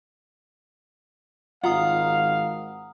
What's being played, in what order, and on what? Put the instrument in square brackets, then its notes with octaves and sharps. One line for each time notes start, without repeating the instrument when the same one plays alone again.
[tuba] G#1 [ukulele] F4 [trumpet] F5 [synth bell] F#5 A#5 D#6